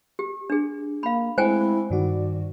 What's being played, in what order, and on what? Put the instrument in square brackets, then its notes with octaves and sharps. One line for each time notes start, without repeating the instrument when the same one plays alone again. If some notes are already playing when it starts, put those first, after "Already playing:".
[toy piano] G4
D4 G#4
[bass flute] A#3 [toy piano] F5 B5
[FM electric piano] G#3 A3 C4 [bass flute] E4 [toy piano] C5 G5 G#5
[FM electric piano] G2 D#3 F#4 [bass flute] D5